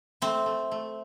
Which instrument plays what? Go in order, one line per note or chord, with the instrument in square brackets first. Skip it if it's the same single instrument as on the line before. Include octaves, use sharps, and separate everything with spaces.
[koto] A3 C4
A3
A3